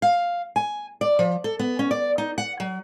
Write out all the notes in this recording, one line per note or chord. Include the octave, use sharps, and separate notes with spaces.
F5
G#5
D5
F3
A4
B3
C#4
D5
D#4
F#5
F#3